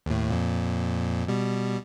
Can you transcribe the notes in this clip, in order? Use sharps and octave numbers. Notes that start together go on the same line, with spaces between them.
D#2 A2
F2 A#2
B2 G3